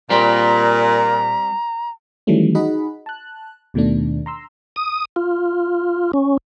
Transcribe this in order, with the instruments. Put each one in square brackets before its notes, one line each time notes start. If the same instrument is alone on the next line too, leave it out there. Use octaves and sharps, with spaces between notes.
[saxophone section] A#2 [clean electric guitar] G3 C4 [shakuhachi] A#5
[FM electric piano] D#3 E3 F#3 G3 A3 C#4
D#4 F#4 G#4 D#5 F#5 B5
A5 F#6
D#2 B2 D#3 A3 D4
A#5 C6 E6
[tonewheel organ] D#6
F4
C#4